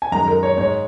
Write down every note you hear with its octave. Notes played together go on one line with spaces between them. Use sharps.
G#5
F#2 D#3 G#3 A#5
A#4
C#5
G#2 G#3 C#5